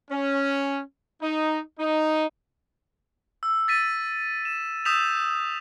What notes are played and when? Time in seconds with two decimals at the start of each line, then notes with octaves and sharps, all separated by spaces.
0.11 C#4
1.22 D#4
1.79 D#4
3.43 E6
3.68 A6 B6 D#7
4.45 E7
4.85 D#6 E6 G6 B6 E7 F7